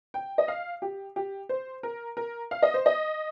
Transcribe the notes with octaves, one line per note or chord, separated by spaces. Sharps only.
G5
D#5
F5
G4
G4
C5
A#4
A#4
F5
D#5
C5
D#5